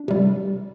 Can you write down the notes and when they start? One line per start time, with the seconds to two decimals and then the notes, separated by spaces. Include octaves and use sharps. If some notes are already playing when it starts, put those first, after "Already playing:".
Already playing: D4
0.08 C3 G3